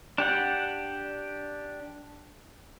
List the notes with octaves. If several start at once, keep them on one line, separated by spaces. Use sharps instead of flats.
D4 G4 F#5